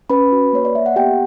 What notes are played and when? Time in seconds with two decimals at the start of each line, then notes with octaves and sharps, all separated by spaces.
0.10 C#4 B4 B5
0.32 F#4
0.53 A#3 C#5
0.65 D5
0.75 A#3 E5
0.86 F#5
0.96 B3 G4 G5